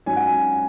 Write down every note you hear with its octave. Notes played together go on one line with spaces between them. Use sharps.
G#2 F#3 C#4 G#5
F#5
G#5